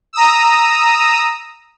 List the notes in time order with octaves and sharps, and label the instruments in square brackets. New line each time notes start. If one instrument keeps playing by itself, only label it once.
[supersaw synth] A#5 D#6 E6